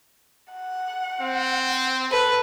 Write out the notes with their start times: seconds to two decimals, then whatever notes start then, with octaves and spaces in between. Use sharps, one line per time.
0.53 F#5
1.21 C4
2.11 A4 B4